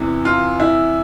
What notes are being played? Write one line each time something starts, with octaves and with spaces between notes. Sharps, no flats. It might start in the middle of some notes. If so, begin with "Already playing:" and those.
Already playing: E2 C3 E3
F4
E4